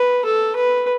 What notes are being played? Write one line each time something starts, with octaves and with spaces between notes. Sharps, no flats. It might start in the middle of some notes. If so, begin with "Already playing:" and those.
Already playing: B4
A4
B4